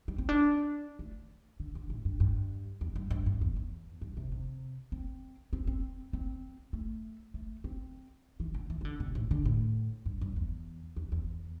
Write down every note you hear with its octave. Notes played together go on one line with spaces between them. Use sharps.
G3
C4
D4
A3
D3
D3
A2
G2
G2
E2
G2
G2
G2
E2
E2
G2
C3
C3
C4
C4
C4
C4
A3
A3
C4
E3
D3
E3
E3
D3
C3
A2
D3
A2
G2
G2
E2
E2
E2